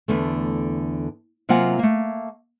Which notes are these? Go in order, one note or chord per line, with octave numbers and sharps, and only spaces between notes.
E2 D3 A3
C3 F#3 A#3 F4 F#5 G#5
A3 A#3